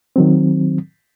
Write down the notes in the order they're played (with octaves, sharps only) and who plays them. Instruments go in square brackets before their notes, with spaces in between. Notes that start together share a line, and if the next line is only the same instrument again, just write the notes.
[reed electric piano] D#3 F#3 C4